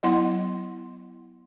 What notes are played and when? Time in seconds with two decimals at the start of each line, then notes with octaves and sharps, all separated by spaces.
0.03 F#3 B3 E4 D#5 F#5 C6